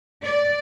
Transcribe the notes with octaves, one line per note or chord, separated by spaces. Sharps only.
D5